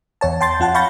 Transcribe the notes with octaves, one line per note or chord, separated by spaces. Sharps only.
E2 C#5 A5
G5 A5 C6 G6 A6
F2 F4 F#5 A5
F5 B5 C#6 G6 A6 A#6